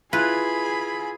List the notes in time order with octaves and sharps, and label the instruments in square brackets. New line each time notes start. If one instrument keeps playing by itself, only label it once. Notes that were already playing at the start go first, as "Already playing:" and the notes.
[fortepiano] E4 F4 [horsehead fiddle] G#4 [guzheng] B4 [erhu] B5